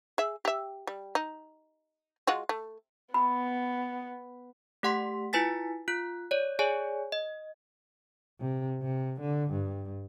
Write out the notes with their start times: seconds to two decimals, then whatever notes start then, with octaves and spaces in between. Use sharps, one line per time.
0.18 G#4 E5
0.45 G4 E5
0.87 G3
1.15 D#4
2.27 G#3 F4 F#4
2.49 A3
3.14 B3 B5
4.83 A3 G4 F#5 C6 B6
5.33 E4 F4 B4 G#5 A6 B6
5.88 F4 F#6
6.31 C#5 D5
6.59 G#4 C#5 D5 G#5
7.12 D#5
8.40 C3
8.82 C3
9.20 D3
9.51 G2